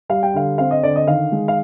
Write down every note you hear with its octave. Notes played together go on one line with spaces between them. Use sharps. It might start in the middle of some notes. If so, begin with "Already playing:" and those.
G3 F5
G5
D3 F5
C4 F5
D#5
D3 D5
D#5
D#3 F5
G#3
F5